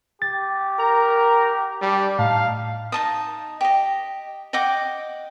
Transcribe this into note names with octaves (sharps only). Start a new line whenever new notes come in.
G4 A6
A#4 A#5
G3 D4 D6
A2 D#4 F5 A5
D#4 A5 D#6
G4 D#5
D#5 F#5 G5 D6